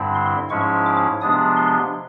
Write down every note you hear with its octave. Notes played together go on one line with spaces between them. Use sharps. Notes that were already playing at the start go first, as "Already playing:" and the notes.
Already playing: G2 D3 G3 C4 E4
C6
G#2 F3 G#3 C#4 E4 C#6
D6
C3 F3 G#3 B3 D4 D#6
C6